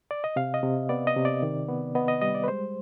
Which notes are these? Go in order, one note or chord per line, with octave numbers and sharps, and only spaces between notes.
D5
D#5
C3 F5
D#5
C3
B3 D5
D#5
C3
D5
D#3
B3
B3 D#5
D#5
G3 D#5
D5
B4
G#3 C5